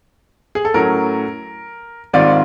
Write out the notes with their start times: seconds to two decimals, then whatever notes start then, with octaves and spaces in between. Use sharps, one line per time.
0.55 G#4
0.65 A4
0.74 A2 F#3 A3 C#4 A#4
2.13 G#2 D#3 G3 C4 F4 D5